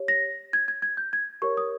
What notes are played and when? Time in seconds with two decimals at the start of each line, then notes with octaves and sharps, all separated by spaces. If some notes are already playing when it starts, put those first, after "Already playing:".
Already playing: G4 C#5
0.08 A#6
0.53 G#6
0.68 G#6
0.82 G#6
0.97 G6
1.13 G#6
1.42 G4 A#4 C#5 C#6
1.57 D#6